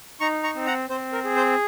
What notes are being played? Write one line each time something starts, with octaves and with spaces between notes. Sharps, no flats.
D#4 A#5 C#6
A#5 C#6
C4
F#5 A#5
C4 C5
A#4
G#4
C5